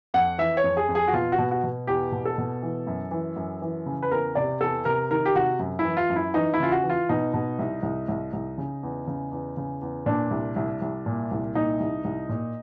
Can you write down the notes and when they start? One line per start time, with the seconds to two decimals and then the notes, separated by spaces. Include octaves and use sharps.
0.14 F2 F#5
0.38 E3 E5
0.57 C#5
0.64 F2
0.77 G#4
0.88 F2
0.95 G#4
1.08 F#4
1.13 B2 F4
1.32 F#4
1.38 B2
1.51 F#4
1.64 B2
1.87 E2 G4
2.12 B2
2.25 A4
2.38 B2
2.63 E3
2.87 F#2
3.11 E3
3.36 F#2
3.62 E3
3.86 C#3
4.03 B4
4.11 E2 A#4
4.35 C3 D5
4.60 E2 A4
4.85 C3 A#4
5.11 D#3 A#4
5.25 G4
5.35 C3 F#4
5.59 F#2
5.79 E4
5.85 E3
5.97 F4
6.09 F#2
6.16 E4
6.34 E3 D#4
6.54 E4
6.60 C#3 F4
6.72 F#4
6.83 E3
6.90 F4
7.09 B2 D#4
7.34 B2
7.59 C2
7.83 C2
8.08 C2
8.33 C2
8.58 C#3
8.83 E2
9.07 C#3
9.31 E2
9.57 C#3
9.81 E2
10.06 A#2 D4
10.31 C2
10.56 C2
10.82 C2
11.06 A#2
11.31 C2
11.55 A#2 D#4
11.80 C2
12.04 C2
12.29 A#2